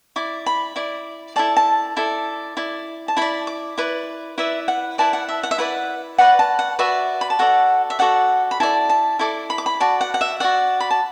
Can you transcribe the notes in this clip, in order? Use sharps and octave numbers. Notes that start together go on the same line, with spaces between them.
E4 D5 D6
B5
E4 D5
E4 A4 D5 A5
A5
E4 A4 D5
E4 D5
A5
E4 D5 B5
D6
E4 B4 D5
E4 B4 D5 E5
F#5
E4 B4 D5 A5
F#5
E5
F#5
E5
E4 B4 D5 F#5
F#4 B4 D5 F#5
A5
F#5
F#4 B4 D5 E5
B5
A5
F#4 A4 D5 F#5
E5
F#4 A4 D5 F#5
B5
E4 A4 D5 A5
A5
E4 A4 D5 D6
B5
D6
B5
F#4 D5 A5
F#5
F#5
E5
F#4 D5 F#5
B5
A5